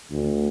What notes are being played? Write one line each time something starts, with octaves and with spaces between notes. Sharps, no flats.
D2